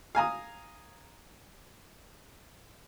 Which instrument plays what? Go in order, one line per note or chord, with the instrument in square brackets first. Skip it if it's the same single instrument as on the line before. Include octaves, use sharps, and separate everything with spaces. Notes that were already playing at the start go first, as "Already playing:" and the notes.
[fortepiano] F5 G#5 A#5 D#6